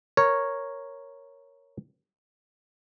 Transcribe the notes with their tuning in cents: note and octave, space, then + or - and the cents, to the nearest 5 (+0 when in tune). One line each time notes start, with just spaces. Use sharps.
A#4 +0 C#5 -5